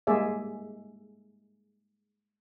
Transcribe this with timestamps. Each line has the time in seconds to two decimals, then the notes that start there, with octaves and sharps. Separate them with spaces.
0.07 G3 G#3 A#3 G#4 D5 E5